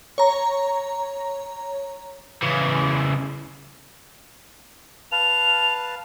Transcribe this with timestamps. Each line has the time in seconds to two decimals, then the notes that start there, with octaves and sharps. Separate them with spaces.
0.18 C#5 A#5
2.42 C#3 E3
5.12 B4 F5 A5 F7